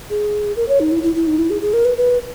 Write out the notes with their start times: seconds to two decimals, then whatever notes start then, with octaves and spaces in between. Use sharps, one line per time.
0.10 G#4
0.56 A#4
0.68 C#5
0.80 D#4
0.91 E4
1.03 E4
1.16 E4
1.27 D#4
1.38 E4
1.50 G#4
1.62 G#4
1.73 A#4
1.85 B4
1.97 B4